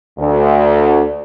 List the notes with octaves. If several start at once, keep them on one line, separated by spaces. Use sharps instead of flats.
D2